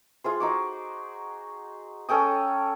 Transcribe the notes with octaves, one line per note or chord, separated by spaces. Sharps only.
F4 G#4 C5
D#4 F#4 D6
C#4 A4 G5 D#6